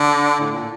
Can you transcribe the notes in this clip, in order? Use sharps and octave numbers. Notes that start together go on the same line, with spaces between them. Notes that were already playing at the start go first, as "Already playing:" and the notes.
Already playing: D3
A2
A#2